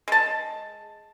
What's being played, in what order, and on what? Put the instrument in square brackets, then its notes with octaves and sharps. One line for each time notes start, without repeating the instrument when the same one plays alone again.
[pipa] G#3 A5